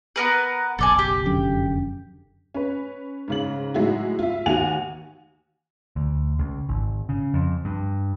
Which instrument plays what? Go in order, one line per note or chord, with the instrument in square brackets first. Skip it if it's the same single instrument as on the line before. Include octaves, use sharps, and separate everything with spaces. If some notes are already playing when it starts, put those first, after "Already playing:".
[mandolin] B3 A#4 B4
[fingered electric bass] F#1 B1 [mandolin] A4 D5 G#5
[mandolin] G4
[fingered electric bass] F1 F#2 D3
[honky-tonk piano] C#4 B4
G#2 C#3 F#7
A2 F#3 G#3 D#4 E4 F#4
F4 E5
D#2 D#3 F#4 F#5 G#5 F7
[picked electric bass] D2
C#2
G#1
C#3
F2
G2